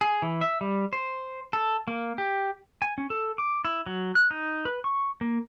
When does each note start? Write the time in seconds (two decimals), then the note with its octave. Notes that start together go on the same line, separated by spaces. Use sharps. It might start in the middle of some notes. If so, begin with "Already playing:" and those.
0.01 G#4
0.22 E3
0.41 E5
0.61 G3
0.93 C5
1.53 A4
1.88 A#3
2.18 G4
2.82 G#5
2.98 C#4
3.10 A4
3.38 D6
3.65 E4
3.86 F#3
4.15 F#6
4.31 D#4
4.65 B4
4.84 C#6
5.21 A#3